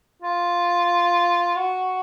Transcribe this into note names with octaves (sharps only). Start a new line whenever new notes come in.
F4
F#4